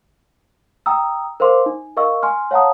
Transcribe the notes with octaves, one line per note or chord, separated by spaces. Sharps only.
G5 A#5 D#6 E6
A#4 C5 F5 C6 D6
D#4
A#4 D#5 F5 C#6 E6
G#5 C6 F6
C#5 F5 F#5 A5 A#5 D#6